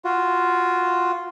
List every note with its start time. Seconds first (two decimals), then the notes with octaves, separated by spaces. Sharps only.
0.05 F4 F#4